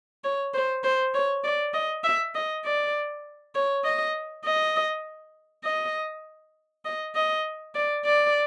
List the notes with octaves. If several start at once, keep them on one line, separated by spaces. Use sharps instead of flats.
C#5
C5
C5
C#5
D5
D#5
E5
D#5
D5
C#5
D#5
D#5
D#5
D#5
D#5
D5
D5